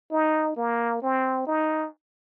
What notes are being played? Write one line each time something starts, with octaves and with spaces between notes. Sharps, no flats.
D#4
A#3
C4
D#4